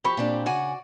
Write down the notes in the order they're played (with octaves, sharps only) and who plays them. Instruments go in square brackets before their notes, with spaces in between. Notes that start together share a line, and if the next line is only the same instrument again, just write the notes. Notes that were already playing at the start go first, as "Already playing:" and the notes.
[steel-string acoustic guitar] F3 [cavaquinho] G4 B5 C#6
[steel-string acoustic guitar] A#2 C4 D4
[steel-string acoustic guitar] C#3 F#5 G#5 [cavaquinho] F#4 D5